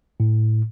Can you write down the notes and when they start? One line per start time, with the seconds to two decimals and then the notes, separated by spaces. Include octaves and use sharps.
0.20 A2